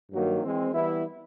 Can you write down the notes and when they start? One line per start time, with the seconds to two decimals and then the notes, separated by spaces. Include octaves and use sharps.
0.11 G2 D#3 F#3 A#3
0.42 E3 G#3 C4
0.72 E3 G3 B3 E4